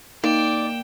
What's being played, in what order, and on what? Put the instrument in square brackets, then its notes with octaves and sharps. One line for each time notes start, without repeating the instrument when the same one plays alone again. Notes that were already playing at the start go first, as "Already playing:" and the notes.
[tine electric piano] A#3 [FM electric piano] D#4 [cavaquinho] D5 [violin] G5 E7